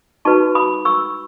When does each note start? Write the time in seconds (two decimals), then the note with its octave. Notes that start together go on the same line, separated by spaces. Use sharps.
0.25 D#4 F#4 B4 A5 C#6
0.55 B5 D#6
0.85 C#6 E6